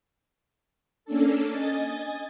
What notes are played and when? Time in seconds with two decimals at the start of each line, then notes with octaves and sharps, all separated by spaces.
1.05 A#3 C#4 D4 A4
1.50 D#5 G#5 A6